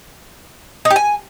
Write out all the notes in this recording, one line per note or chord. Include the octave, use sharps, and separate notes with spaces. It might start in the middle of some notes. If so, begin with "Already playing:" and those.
D#4
G4
G#5